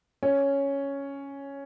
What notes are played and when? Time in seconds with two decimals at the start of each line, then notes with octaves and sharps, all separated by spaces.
0.23 C#4